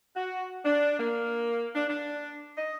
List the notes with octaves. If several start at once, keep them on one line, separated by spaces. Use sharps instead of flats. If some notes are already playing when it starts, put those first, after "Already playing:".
F#4
D4
A#3
D4
D4
D#5